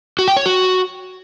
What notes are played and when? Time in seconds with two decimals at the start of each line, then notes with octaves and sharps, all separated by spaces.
0.19 F#4
0.28 G5
0.37 C#5
0.46 F#4